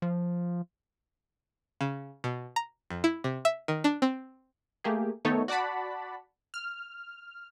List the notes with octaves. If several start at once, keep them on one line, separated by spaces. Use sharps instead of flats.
F3
C#3
B2
A#5
F2
E4
C3
E5
D#3
D4
C4
A3 A#3 G4 G#4
D#3 A3 B3 D#4 A4 C#5
F#4 D5 F#5 A5 B5
F6